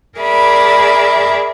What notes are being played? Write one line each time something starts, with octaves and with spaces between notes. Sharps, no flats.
G#4 A#4 D5 E5 B5